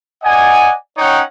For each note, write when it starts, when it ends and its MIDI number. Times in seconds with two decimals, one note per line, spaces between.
0.23 0.74 74
0.23 0.74 75
0.23 0.74 78
0.23 0.74 80
0.97 1.21 61
0.97 1.21 63
0.97 1.21 73
0.97 1.21 78
0.97 1.21 79